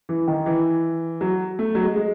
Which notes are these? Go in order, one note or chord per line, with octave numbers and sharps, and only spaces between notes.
E3
D#3
E3
F#3
A3
F#3
G#3
G#3